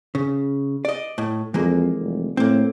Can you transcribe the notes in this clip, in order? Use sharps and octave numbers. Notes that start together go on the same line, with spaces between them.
C#3
D5 D#5
A2
F2 E3 G#3 A#3
F1
A2 A#3 C4